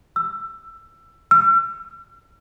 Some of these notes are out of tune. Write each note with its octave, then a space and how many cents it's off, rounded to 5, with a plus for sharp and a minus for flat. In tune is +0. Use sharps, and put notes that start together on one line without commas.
E6 +20
E6 +45